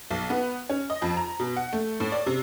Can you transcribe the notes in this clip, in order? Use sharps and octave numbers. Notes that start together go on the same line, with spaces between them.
B1
B3
C#4
D#5
F2
A#5
B2
F#5
A3
A2
D5
C3